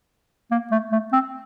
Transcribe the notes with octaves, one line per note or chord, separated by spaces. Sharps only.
A#3
A3
A3
C4